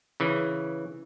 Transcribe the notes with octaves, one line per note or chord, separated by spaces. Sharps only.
C#3 E3